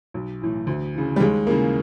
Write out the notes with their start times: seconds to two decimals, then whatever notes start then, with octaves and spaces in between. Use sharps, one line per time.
0.14 B1
0.41 A2 E3
0.67 D2
0.94 C#3 E3
1.16 G3
1.20 D#2 G#3
1.47 C#3 E3 A#3